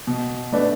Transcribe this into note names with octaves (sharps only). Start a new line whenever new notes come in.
B2
A3 D4 B4 D5